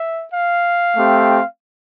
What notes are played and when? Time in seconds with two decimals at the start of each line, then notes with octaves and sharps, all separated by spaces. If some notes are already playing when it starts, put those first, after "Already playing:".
Already playing: E5
0.33 F5
0.96 A3 C4 G4